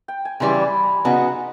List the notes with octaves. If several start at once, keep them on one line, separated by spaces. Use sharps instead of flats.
G5
G#5
C#3 E3 G3 C6
B5
A#5
C#3 F#3 B3 D#4 F#4